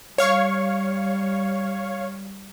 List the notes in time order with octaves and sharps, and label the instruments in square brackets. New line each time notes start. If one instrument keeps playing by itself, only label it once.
[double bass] G3 [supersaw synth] C#5 F5 C#6